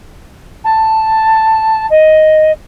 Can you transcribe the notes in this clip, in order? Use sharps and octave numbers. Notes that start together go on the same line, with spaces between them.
A5
D#5